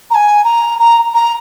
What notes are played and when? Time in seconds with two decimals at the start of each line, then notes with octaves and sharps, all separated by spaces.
0.10 A#5
0.14 G#5
0.44 A#5
0.79 A#5
1.14 A#5